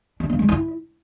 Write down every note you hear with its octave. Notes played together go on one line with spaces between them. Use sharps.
D4
A#3
G#3
E4